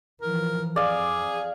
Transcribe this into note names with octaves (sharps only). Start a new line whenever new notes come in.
E3 F3 A#4
F2 G#4 D5 F5